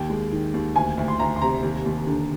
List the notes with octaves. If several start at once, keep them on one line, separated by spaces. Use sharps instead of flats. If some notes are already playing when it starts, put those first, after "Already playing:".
Already playing: D#2 G5
G#3
D#3
D#2
D2 G#5
D2
C6
D2 A#5
C6
C3 A#5
D#2
D#2
D3